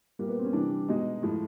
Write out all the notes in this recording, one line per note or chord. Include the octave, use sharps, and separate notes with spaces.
A#2 G3 A#3
B3
C4
C#4
C3 E3 G3 D4
B2 G#3 D#4
A2 F3 G#3